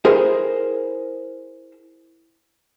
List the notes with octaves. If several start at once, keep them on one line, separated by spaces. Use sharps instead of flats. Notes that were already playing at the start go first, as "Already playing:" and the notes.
E4 G#4 A#4 C5